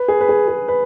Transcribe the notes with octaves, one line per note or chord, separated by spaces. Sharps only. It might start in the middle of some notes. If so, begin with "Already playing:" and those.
Already playing: B4
G#4
B4
G#4
G#4
B4